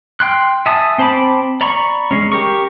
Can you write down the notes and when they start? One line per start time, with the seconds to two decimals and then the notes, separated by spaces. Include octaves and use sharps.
0.20 G5 C6 F#6
0.66 E5 G#5 A5 D#6
0.98 C4 C5 A5 B5 D6
1.61 D5 A#5 B5 C#6
2.11 G#3 C#4
2.32 G4 A#4 C#6